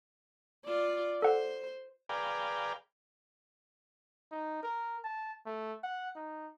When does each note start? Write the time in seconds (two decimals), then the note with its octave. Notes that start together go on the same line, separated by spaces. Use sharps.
0.65 F4 D5
1.22 A4 C5 F#5
2.09 G#4 A#4 B4 D5 F5 G5
4.31 D#4
4.63 A#4
5.04 A5
5.46 A3
5.84 F#5
6.16 D#4